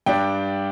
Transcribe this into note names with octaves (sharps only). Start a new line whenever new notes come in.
G2 G3 D4 G5